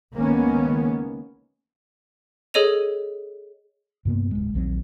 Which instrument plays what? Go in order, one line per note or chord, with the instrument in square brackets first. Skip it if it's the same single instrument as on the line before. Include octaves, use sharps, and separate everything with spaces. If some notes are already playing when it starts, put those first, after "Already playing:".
[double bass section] C#2 D#3 A#3 B3 C#4
[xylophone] G#4 A4 C#5 D#5 D#7 F7
[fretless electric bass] G2 C3 A#3 B3
D1 G#3
A#1 D#2 F#3 C4